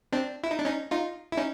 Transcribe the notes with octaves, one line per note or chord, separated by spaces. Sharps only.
C4 D4
E4
D#4
D4
C#4 D#4
D#4 F4
E4
C#4 D#4